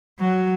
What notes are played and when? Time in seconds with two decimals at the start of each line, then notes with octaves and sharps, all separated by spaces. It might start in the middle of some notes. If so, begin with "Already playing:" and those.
0.20 F#3